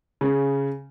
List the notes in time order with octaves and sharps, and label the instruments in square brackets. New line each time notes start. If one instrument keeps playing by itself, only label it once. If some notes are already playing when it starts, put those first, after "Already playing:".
[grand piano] C#3